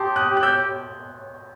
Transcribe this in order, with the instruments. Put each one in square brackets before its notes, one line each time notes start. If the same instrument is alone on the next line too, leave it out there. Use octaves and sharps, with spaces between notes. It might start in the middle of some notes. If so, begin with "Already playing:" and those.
Already playing: [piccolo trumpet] G4 [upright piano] A5 C6 D#6
[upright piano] D#6 F#6
[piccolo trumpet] G4
[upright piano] F#6
E6 G6